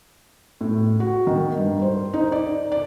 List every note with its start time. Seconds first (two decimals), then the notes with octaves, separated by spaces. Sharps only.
0.61 A2
1.00 F#4
1.27 D#3
1.57 G2
1.82 C5
2.14 D#4
2.32 D5
2.72 D5